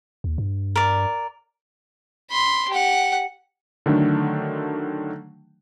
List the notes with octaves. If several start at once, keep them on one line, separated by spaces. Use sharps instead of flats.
D#2
G2
A#4 D5
B5 C6
G4 F#5
D3 D#3 F#3 A3 D4